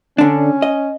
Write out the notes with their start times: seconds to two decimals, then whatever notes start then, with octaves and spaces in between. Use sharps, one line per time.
0.18 D3 C#4 D4
0.62 D#5